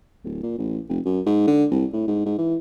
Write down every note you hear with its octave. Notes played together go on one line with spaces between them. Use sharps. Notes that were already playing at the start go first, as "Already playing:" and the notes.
D1
A#2
A1
F1
F#2
G#2
D3
C2
A2
G#2
G#2
E3